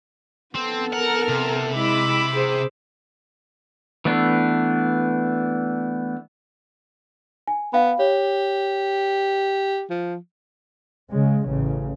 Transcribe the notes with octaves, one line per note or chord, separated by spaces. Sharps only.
B3 C4 A4
A#4 F#5 F6
C3
G#3 E4 B5 D6 E6
G#4 C5
E3 A3 B3 D4
G#5
B3 F5 G5 B5
G4 C#5
F3
C#3 G#3
A1 C#3